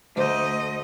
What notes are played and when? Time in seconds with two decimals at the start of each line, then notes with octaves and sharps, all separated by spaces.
0.16 D2 A3 C5 D#5 G6